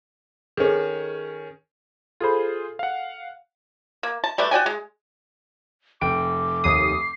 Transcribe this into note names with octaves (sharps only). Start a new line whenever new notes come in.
D#3 C#4 G#4 A4
F4 G#4 A4 C5 B5
F5 F#5
A#3
A5
G3 A3 B4 D5
F#4 D5 G5 G#5
G#3
F1 G5 D6 D7
D#2 D#6 C7